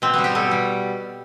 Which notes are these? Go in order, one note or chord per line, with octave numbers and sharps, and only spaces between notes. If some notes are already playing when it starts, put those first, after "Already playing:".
B2 C4
G3 B3
G4
B2 A4
G3